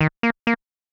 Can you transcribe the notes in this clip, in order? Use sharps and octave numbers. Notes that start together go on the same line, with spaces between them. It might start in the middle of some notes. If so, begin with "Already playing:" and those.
D#3
A#3
A#3